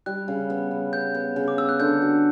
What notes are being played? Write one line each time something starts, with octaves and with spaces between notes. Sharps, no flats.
G3 F#6
C#3
B3
C#3
B3 G6
B3
C#3
D6
B3 E6
F#6
D3 G6
F#4